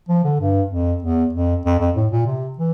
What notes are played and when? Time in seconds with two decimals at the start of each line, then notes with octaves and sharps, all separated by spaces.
0.09 F3
0.24 D3
0.40 G2
0.71 F2
1.03 E2
1.33 F2
1.65 F2
1.80 F2
1.96 A2
2.12 A#2
2.26 C3
2.58 E3